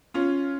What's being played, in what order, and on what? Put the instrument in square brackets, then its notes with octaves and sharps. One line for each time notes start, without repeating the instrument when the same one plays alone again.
[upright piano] C#4 F4